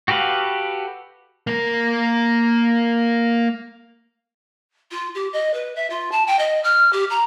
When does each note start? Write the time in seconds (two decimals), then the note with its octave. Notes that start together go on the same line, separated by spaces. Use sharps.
0.08 F#4 G4 A4 B4 F5
1.47 A#3 A#4
4.91 F4
5.15 G4
5.33 D#5
5.54 B4
5.76 E5
5.90 F4
6.12 A5
6.27 G5
6.39 D#5
6.64 F6
6.93 G4
7.10 A#5